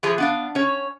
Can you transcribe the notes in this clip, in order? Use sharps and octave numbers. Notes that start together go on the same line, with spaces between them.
E3 F3 G#4
B3 D4 F5
C#4 C#5